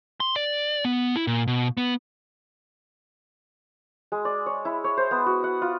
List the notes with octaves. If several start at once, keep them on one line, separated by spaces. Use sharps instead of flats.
C6
D5
B3
E4
A#2
B2
B3
G#3
D5
C#5
E4
C#5
C5
B3
F#4
F#5
F4